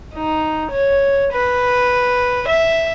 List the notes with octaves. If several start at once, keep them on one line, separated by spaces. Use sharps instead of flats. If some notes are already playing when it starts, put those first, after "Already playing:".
D#4
C#5
B4
E5